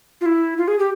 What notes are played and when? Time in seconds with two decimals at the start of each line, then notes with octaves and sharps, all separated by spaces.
0.21 F4
0.26 E4
0.58 F4
0.68 G#4
0.79 G4